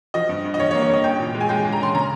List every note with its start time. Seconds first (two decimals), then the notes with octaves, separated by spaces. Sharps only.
0.14 F3 D#5
0.29 G2
0.44 G2
0.54 D#5
0.59 G2 C#5
0.71 C#5
0.75 A#3
0.83 C#5
0.89 G2 D#5
1.04 C#4 G5
1.20 A#2
1.35 G#3
1.41 G#5
1.49 G#3 G5
1.65 G#3
1.72 A#5
1.80 C#4 C6
1.94 C#3 A#5